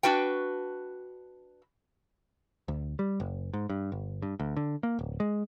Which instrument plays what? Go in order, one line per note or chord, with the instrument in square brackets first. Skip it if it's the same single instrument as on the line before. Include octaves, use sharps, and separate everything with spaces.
[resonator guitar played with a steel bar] D4 F#4 B4 G5
[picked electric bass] D2
G3
F#1
G#2
G2
G1
G2
D2
D3
A#3
D1
G#3